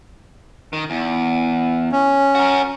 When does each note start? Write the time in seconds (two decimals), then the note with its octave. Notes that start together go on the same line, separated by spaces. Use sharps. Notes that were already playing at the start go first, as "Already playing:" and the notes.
0.73 D#3
0.90 E2
1.92 C#4
2.35 F#4 A#4